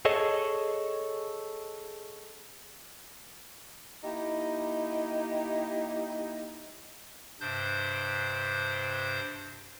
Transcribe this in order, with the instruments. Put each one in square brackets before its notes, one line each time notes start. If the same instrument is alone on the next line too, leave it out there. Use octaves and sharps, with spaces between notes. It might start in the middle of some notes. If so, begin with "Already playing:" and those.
[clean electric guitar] G#4 A4 C#5 D#5
[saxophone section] A#3 D#4 E4 G4
[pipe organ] G2 C3 D4 C5 G6